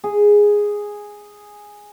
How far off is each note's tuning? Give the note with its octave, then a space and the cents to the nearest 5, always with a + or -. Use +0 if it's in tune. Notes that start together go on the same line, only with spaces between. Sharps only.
G#4 -5